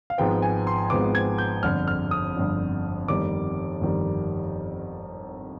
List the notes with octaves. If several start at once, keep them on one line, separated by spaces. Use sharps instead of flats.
F5
G#1 G#2 F3 G#3 B3 G5
G#5
C6
G#1 G#2 F3 G#3 B3 D6
G#6
G6
G1 F2 D3 F6
F6
D#6
G1 F2 D3
G1 F2 D#3 G3 D6
G1 F2 D#3 G3